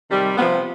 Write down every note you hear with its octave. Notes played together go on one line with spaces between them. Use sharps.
C3 D#3 G3
C3 F3 B3